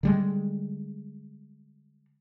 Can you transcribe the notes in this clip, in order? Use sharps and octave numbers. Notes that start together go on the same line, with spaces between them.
D3 G3 G#3